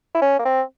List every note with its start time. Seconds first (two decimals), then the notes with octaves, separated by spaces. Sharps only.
0.15 E4
0.22 C#4
0.39 A#3
0.45 C4